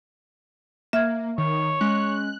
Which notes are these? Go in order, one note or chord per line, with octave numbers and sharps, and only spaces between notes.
A#3 E5 F6 G#6
D#3 C#5
G#3 C#4 F#6